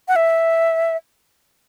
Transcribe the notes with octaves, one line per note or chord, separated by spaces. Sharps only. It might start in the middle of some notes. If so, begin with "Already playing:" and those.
F#5
E5